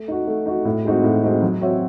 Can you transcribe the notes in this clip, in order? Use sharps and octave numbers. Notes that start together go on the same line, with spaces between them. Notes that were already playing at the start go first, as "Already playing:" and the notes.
Already playing: A3
D#4 F#4
A3
D#4 F#4
A2
G#3 C4 D#4 F#4
A2
G#3 C4 D#4 F#4
F#3
C4 F#4 C#5 E5